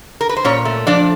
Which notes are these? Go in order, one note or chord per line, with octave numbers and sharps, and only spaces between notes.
A#4
B4
C5
A#2 C#4 C#5
A3
F3 D4 D5